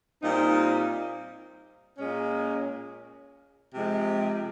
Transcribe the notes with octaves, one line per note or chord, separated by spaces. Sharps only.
A#2 G3 C4 D#4
A#2 G#3 C#4
C3 F3 G#3